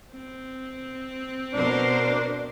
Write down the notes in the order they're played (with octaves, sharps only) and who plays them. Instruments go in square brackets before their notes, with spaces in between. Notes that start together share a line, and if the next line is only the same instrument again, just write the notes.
[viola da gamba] C4
[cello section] B2 A#4 C5 [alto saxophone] D4